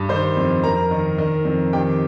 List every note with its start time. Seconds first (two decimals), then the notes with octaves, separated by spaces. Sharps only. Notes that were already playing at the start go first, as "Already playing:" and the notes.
Already playing: G2
0.09 D#3 C5 C6
0.37 F2
0.63 F2 A#4 A#5
0.91 D#3
1.18 D#3
1.45 F2
1.73 D#3 G4 G5